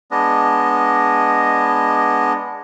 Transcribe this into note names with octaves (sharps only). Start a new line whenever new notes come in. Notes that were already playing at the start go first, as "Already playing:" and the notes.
G#3 B3 D4 D#5